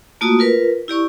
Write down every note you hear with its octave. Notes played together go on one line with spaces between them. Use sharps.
A3 A#3 F4 F#4 D#6
F4 A#4 B4
E4 G4 D5 C#6